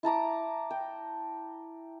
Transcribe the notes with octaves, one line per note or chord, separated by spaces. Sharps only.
E4 A5 A#5 D6
G5